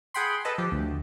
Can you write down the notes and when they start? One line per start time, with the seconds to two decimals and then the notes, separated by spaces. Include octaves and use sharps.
0.14 G#4 F#5 G5 B5 C6
0.45 A4 B4 D#5 A5
0.58 F3 G4
0.72 D2